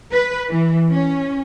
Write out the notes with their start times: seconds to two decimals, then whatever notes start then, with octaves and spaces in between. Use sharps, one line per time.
0.12 B4
0.48 E3
0.91 C#4